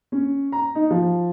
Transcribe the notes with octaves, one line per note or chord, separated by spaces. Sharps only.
C#4
A#5
D#4
F3